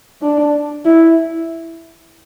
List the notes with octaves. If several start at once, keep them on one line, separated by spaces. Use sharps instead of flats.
D4
E4